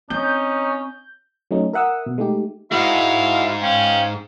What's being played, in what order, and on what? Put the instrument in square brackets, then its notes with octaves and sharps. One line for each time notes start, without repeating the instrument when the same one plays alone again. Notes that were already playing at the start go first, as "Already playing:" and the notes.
[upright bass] C4 [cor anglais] C#4 [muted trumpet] D#4 [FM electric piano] G6
[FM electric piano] F#3 A3 C#4 D#4
A#4 E5 F#5 D#6 E6
B2
G#3 A3 D#4 G4
[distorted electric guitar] G#2 G#3 [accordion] E4 F#4 E5 [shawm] F5
[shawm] C#4 [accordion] F5 G5